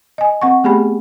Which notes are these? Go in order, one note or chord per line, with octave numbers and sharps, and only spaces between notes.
D#5 G#5
C4 F#5 C#6
A3 B3 G4 G#4 B5